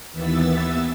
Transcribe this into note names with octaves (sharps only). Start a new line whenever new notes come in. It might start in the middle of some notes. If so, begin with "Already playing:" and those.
D#2 E3 B3 E5 E6 A6